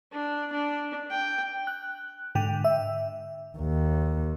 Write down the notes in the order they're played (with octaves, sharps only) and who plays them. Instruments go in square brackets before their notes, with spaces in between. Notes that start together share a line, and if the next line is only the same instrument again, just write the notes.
[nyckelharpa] D4
D4
G5
[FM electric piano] F#6
G#2 D3 G5
E5
[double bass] D#2